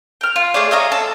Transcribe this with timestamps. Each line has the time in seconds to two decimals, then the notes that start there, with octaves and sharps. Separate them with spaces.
0.21 G5 F6
0.36 F4
0.54 A3 G#4 C#5 D5
0.71 C#5 D#5 F5 A#5
0.92 A4